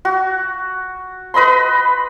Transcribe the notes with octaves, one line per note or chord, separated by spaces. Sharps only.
F#4
B4 D#5 B5 C6